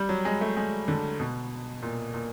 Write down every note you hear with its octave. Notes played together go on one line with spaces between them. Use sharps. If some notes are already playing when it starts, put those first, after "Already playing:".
Already playing: G3
F#3
G#3
A3
G#3
D3
B2
A#2
A#2